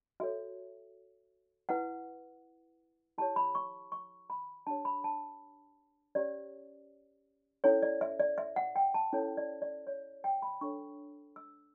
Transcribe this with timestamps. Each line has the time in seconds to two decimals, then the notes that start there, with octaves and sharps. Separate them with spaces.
0.20 F#4 A4 C#5 E5
1.69 E4 B4 F#5
3.18 E4 G4 C#5 A5
3.36 B5
3.55 C#6
3.92 C#6
4.30 B5
4.67 D4 G4 C#5 A5
4.85 B5
5.04 A5
6.15 C#4 G4 C#5 D5
7.64 C#4 E4 A4 C#5
7.82 D5
8.01 E5
8.20 D5
8.38 E5
8.56 F#5
8.76 G5
8.94 A5
9.13 C#4 E4 A4 C#5
9.37 D5
9.62 D5
9.87 C#5
10.24 G5
10.42 B5
10.61 D4 A4 C#5 C#6
11.36 E6